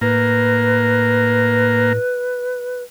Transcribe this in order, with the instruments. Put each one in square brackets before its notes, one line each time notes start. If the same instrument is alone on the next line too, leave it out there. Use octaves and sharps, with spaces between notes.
[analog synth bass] A2 [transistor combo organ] A#3 [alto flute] B4